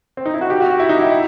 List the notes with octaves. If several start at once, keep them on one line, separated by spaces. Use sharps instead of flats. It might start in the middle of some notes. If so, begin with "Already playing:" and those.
C4
D#4
E4
F#4
G4
F#4
F#4
E4
D#4
E4
E4